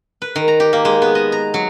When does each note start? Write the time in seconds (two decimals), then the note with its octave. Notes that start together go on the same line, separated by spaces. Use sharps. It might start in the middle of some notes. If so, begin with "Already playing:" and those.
0.22 B4
0.36 D#3
0.48 A#5
0.60 G4
0.73 A#3
0.85 G#3
1.02 B3
1.15 D#5
1.32 A#5
1.54 F#3